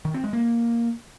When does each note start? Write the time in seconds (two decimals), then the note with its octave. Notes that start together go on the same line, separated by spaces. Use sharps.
0.05 D#3
0.14 C4
0.24 G#3
0.33 A#3